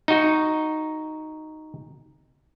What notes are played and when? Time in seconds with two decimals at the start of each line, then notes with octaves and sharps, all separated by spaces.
0.08 D#4 F#4